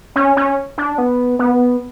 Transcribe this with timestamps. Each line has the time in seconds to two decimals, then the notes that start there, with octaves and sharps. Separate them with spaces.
0.16 C#4
0.37 C#4
0.78 D4
0.98 B3
1.39 B3